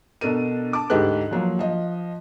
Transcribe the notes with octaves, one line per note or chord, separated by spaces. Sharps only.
B2 D4 A4 A#4 D#7
A5 D6
D2 G#2 G4 A4 B4 F#6
F3 F#3 A#3
F3 D#5